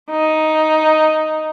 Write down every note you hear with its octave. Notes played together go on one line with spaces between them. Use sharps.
D#4